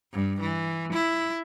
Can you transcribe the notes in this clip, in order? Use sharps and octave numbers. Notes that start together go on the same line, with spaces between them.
G2
E3
E4